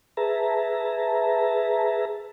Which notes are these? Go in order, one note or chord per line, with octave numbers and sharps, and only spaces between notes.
G#4 B4 E5 A5 A#5